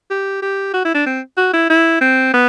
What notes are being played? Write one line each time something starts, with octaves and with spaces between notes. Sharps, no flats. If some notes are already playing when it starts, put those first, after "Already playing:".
G4
G4
F#4
E4
D4
C4
F#4
E4
E4
C4
B3